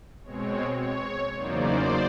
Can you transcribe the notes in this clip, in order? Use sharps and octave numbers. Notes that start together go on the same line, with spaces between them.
B2 G#3 C4 C#5
C#5
E2 C#3 F#3 A#3 D#4 C5 D5